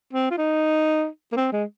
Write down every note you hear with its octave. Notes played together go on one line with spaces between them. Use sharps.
C4
F4
D#4
A#3
C4
G#3